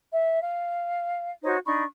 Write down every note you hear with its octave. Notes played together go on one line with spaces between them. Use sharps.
E5
F5
D#4 F#4 C5 C#5
D4 D#4 B5 C#6